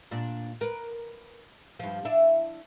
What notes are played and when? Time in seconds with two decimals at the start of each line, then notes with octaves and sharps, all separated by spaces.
0.11 A#2 D4
0.61 A#4 B4
1.79 G2 F3
2.05 D4 E4